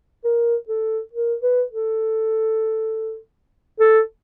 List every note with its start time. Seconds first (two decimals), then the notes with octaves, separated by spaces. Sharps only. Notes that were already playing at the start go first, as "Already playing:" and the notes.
0.24 A#4
0.69 A4
1.13 A#4
1.43 B4
1.72 A4
3.80 A4